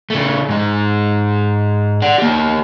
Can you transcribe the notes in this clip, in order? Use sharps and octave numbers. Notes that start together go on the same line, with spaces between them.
C#3 A3
G#2 G#3
D5 F#5
A#3 G4